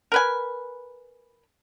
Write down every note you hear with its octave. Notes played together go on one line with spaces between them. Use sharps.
A#4 B4 G#5